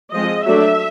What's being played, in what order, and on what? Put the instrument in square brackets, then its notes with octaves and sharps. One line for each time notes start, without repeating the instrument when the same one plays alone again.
[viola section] F3 G#3 C4 D#5
F#3 A3 D4 E5